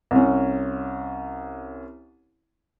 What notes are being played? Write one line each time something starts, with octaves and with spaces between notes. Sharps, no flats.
C2 C#4